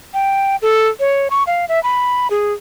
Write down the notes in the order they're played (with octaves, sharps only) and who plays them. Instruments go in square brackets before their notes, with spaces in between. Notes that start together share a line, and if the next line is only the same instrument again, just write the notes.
[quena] G5
A4
C#5
C#6
F5
E5
B5
G#4